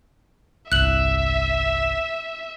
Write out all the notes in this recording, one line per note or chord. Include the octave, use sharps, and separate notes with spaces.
G1 C2 E5 F#6 F#7